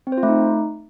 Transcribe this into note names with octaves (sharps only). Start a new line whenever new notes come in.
C4
C5
F4
A3
D#4